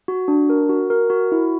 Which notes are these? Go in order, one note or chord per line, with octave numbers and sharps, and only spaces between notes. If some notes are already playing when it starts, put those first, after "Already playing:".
F#4
D4
A#4
F#4
A#4
F#4
E4